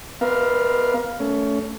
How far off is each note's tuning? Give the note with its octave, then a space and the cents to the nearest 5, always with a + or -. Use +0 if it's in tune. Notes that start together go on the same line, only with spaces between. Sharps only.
B3 +10 A#4 +30 F5 +0
A3 +0 C#4 +20